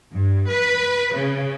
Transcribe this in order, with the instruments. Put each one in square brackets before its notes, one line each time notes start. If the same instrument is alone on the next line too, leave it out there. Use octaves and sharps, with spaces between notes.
[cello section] G2
B4
C#3